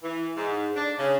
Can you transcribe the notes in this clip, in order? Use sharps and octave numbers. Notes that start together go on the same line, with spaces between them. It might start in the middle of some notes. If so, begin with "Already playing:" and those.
E3
G#2
D4
C#3